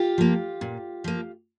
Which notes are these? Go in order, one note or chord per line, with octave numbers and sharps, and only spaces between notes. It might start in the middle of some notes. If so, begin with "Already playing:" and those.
Already playing: F4 G4
F3 A#3
A#2
F3 A#3